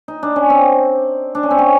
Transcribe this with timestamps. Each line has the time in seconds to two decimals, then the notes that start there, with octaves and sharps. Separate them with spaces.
0.08 D#4
0.23 D4
0.36 C#4
0.50 C4
1.35 D4
1.43 C#4
1.50 C4
1.58 C#4